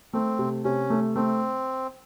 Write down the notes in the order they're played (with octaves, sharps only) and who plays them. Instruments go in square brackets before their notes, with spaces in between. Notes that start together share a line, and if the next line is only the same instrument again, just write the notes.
[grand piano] A3 [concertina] C4
[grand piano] C3
[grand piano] C3 [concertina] C#4
[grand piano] A3
[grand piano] A3 [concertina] C4